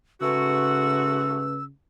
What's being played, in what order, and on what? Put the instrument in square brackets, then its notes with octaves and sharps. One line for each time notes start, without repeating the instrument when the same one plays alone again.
[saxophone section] G#2 A3 F#4 [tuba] C#3 [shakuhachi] B4 [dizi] E6